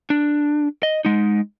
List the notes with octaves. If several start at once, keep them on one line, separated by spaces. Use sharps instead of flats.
D4
D#5
G#3 D#4